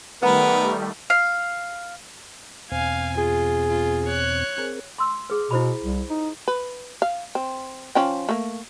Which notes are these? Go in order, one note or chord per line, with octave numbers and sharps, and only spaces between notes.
D#3 G3 A3 B3 A#4 B4 F#5
F5
E2 B2 C4 F5 G#5
F4 G#4
F4
C#5 F#6
C4 G#4 A#4
C6 E6
G#4 B4
B2 E4 C5 B5
C2
D#4
B4
F5
C4
F3 C#4 G5
A3 A#3